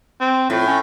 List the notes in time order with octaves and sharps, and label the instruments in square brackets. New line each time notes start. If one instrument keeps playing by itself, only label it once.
[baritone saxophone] C4
[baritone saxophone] F2 [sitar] A2
[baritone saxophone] C#4